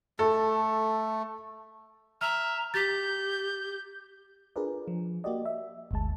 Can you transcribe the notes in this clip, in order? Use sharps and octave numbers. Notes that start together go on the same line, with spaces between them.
A3 A4
E5 A#5 F6
G4 G6 A6 B6
D4 F4 G#4 A#4 B4 D5
F3
A#3 F#4 G4 D5 D#5
E5
G1 D2 G#3 A5